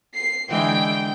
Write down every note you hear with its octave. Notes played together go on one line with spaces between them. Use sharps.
C7
D3 E3 G#3 G5